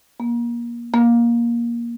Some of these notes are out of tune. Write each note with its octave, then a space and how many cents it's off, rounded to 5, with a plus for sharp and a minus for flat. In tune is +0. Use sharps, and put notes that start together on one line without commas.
A#3 +25
A#3 +15